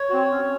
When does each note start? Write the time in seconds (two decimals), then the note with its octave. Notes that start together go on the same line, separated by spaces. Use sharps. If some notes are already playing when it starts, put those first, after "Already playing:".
Already playing: C#5
0.09 C4 F#4
0.31 C#4